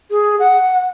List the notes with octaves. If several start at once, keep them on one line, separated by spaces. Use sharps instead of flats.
G#4
F#5